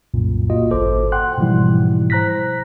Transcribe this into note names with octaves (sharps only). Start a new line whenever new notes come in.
C2 F#2 A#2
A#3 F4 F#4 D#5
G#1 A4 C5 D6
F#5 G5 C6 F#6
G#2 B2 E3 F3 G3 E4
C5 A#5 F#6 A#6 B6